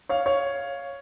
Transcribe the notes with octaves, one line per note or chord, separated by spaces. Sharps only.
C#5 F5
C#5 F5